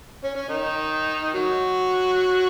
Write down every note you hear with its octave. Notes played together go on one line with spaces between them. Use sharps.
C#4
C#4
D#3 D#4
F#3 F#4